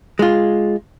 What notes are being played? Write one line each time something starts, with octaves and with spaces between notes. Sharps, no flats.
G#3 F4